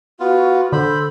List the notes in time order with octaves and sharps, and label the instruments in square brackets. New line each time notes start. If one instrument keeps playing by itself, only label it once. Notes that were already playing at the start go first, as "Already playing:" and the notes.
[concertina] B3 F4 [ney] F#4
[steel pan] D3 [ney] A4 [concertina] C5 B5